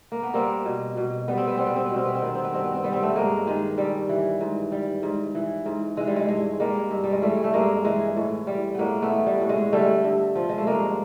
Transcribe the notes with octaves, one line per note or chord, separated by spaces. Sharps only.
A#3
B3
G3 A#3 C4
B2
B2
G3 B3
C4
B3
G3 C4
B3
C4
B2 B3
C4
B3
C4
D#3 B3
C4
B3
G2 C4
B3
C4
G3 B3
C4
A3 B3
G2 G#3 A#3
D#3 G#3
G2 G3
E3
G#2
G3
G#2
E3
G#2
E3 G#3
G3
G#3
G2 G#3
G3 G#3 A#3
G2
G3
G#3
E3 G3 A3
A3
G2 G#3 A#3
E3 G#3
A2
G3
A2 G#3 A#3 B3
A3 B3
E3
G3
A2
G#3
D3 G3 A3
G2
F3
G#3
A3
G2 G#3 A#3